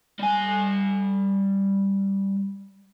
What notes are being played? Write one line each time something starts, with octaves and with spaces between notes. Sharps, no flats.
G3 G#5